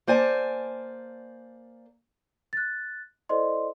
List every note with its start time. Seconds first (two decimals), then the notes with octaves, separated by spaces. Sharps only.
0.07 A#3 C5 D5 G#5 A5
2.53 F#6 A6
3.29 E4 A4 C5 D5 D#5 C6